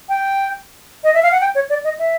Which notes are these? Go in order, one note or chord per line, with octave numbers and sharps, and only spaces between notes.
G5
D#5
E5
F5
F#5
G5
C#5
D5
D#5
E5